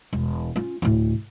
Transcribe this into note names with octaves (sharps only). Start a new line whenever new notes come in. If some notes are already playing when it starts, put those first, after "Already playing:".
E1
C#4 F4
D2 A2